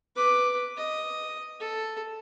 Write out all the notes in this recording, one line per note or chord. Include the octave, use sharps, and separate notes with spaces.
B4 D6
D#5
A4